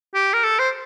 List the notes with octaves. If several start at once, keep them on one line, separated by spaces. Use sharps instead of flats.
G4
A#4
A4
C5